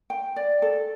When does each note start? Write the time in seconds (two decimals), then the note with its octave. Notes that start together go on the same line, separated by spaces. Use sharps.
0.10 G5
0.36 D5
0.62 A4